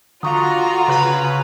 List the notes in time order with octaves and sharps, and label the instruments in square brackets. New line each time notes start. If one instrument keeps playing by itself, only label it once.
[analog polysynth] D3 [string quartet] F4 F#4 [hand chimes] F5 C#6 D#6 [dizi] A#5
[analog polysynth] C#3 B4